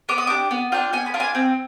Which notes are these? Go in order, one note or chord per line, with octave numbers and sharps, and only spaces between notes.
B3 D6
D#6
D4 G4 D6
B3
D4 F4 G5
B3 G#5
B5
D4 F4
G#5
C4